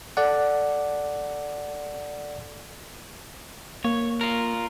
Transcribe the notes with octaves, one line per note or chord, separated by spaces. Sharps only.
A4 D5 F#5
A#3 C#5
F4 A#4